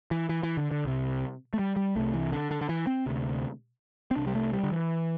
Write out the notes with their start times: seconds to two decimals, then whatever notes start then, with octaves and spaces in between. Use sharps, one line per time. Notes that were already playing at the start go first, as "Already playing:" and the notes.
0.11 E3
0.29 E3
0.43 E3
0.57 D3
0.71 D3
0.84 C2 C3
1.54 A3
1.59 G3
1.76 G3
1.96 C2 C3 A3
2.14 E3
2.32 D3
2.51 D3
2.61 D3
2.69 E3
2.87 C4
3.06 D2 C3
4.11 C4
4.16 C2 C3 D4
4.27 G3
4.35 A3
4.53 G3
4.64 D3
4.72 E3